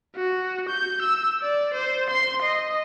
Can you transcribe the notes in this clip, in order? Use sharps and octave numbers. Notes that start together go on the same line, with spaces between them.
F#4
G6
E6
D5
C5
C6
D#5